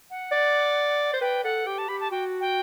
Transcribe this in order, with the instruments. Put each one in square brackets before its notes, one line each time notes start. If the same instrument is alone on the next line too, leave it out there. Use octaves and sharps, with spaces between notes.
[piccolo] F#5
[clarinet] D5
C5
[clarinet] B4 [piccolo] G5
[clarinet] A4 [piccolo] F#5
[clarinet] G4 [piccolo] G5
[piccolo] A5
[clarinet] G4 [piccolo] B5
[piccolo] A5
[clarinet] F#4 [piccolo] G5
[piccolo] G5